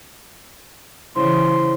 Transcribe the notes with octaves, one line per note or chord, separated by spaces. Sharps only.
C#3 E3 E4 C5 C6